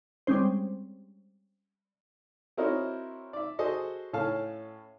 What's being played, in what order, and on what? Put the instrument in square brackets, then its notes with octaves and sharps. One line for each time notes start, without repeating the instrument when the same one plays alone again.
[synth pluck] G3 G#3 C4 C#4 C5
[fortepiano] C4 E4 F#4 A#4 C#5 D#5
D5 E5
F#4 G#4 A4 C5 D#5
A2 C#4 A4 F5 A5